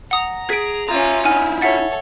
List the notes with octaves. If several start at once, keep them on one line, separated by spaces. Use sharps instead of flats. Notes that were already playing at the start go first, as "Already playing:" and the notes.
F#5 A#5 D#6
G#4 B6 D7
C#4 F4 E5 A#5
D#4 E4 F#5 G#5 F6
A4 C#5 E5 F#5 A6